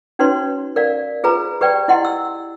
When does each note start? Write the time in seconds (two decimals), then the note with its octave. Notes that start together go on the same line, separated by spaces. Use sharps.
0.19 C#4 D#4 F#4 B4 C#5 C6
0.76 A#4 D5 F5
1.23 F4 G#4 B4 A#5 B5
1.61 G4 B4 D5 G5
1.88 E4 G4 D#5 F#5 C6
2.05 E6